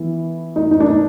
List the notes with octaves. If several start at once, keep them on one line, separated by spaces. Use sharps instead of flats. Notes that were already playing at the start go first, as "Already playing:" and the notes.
Already playing: E3 B3
D#4
D#4
D4
D#4